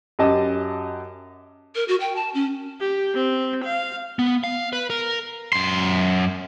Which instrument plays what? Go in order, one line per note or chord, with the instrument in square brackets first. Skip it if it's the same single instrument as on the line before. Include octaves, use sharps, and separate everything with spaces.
[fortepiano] F#2 G4 D#5 A5
[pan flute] A#4
F#4
G5
A5
C#4
[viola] G4
C4
F5
[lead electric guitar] B3
F5
B4
A#4
[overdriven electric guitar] F#2 C6